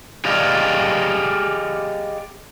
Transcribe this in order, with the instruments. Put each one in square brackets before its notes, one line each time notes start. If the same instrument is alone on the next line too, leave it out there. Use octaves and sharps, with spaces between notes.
[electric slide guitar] G4 G#4 D5 D#5 F5